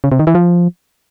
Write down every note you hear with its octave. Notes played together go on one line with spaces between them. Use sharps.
C#3
C3
D#3
E3
F3